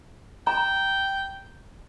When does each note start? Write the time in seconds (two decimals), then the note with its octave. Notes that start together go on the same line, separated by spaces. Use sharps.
0.47 G5 A#5